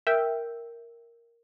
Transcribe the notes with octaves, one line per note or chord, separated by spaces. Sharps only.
A#4 E5 G5